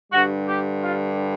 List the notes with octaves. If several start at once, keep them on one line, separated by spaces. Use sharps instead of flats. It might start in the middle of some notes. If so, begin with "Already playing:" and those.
G2 D3 G3 F#4
G4
F4